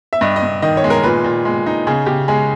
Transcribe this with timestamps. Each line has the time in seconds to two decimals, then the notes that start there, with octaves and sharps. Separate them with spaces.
0.13 E5
0.21 G2 D#5
0.36 D#5
0.43 G2
0.62 D#3 D#5
0.77 C#5
0.84 G#3
0.90 A#4
1.03 A#2 B4
1.24 A#2
1.45 G#3
1.66 D#4
1.87 C#3 G#4
2.06 C#3 G4
2.28 G#3 G#4